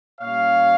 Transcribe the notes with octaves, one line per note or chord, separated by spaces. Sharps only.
A#2 G3 C#4 C#5 F5